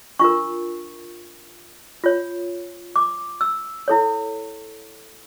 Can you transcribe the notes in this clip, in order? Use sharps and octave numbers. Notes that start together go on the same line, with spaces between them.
D4 F4 A#4 C#6
F4 C#5
D6
E6
E4 A4 C#5